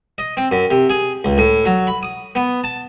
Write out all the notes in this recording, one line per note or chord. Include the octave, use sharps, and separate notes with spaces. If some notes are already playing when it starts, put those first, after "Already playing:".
D#5
C4
F#2
C3
G#4
C#2
A2
F#3
B5
D#6
B3
A5